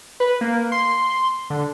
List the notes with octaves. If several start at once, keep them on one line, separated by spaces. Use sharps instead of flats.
B4
A#3
C6
D3